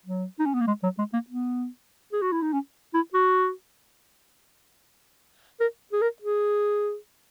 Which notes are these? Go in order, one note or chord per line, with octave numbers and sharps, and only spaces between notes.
F#3
D#4
C#4
B3
A#3
G#3
F#3
G#3
A#3
B3
G#4
F#4
E4
D#4
C#4
E4
F#4
A#4
G#4
A#4
G#4